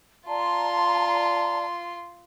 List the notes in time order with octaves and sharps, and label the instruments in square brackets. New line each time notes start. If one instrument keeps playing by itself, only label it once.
[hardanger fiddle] F4 C6 [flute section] D5 A5 A#5